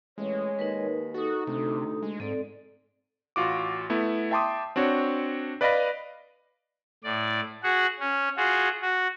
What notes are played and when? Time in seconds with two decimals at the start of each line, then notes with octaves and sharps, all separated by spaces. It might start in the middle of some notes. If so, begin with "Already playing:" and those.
0.18 A1 G#3 C#5
0.59 D#2 D#4 A#4 B4
1.14 D#4 F#4 A4 D#6
1.47 D2 C3
2.02 G#3
2.20 G#2 C4 A4 D5
3.36 A1 F4 F#4 D6
3.90 A3 B3 E4
4.31 E5 G5 A5 C6 D6 D#6
4.76 C4 D4 F#4 C#5
5.61 B4 D5 D#5 F5 B5 A#6
7.04 A2 D5
7.63 F#4 G#4 F#5
8.00 C#4
8.37 F4 F#4 G#4
8.82 F#4